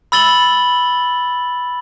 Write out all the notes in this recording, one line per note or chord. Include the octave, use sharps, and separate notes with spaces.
B5 E6 A6 F#7 G7